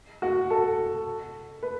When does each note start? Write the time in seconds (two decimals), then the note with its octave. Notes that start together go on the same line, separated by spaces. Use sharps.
0.22 F#4
0.50 A4
1.63 B4